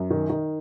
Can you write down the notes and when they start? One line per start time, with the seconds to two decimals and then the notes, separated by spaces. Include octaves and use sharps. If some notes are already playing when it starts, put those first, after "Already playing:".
Already playing: F#2
0.10 D#3
0.29 D#3